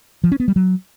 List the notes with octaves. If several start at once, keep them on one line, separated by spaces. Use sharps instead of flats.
F3
C#4
B3
G3
F#3